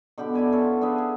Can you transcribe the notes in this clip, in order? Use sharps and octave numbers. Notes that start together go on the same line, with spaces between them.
B2 D3 G4 B5
E4 D5 G#5 A5
B3 C#4 A4
F4
D4 G#4 B4 E5
G#4